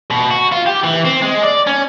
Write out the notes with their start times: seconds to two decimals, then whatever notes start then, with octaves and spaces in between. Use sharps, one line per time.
0.11 B2
0.31 F#4
0.52 F4
0.67 G4
0.84 E3
1.06 C4
1.22 G#3
1.44 D5
1.67 C#4